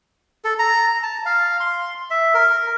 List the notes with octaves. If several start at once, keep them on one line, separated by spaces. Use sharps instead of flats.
A4
A#5
A5
F5
C6
E5
A#4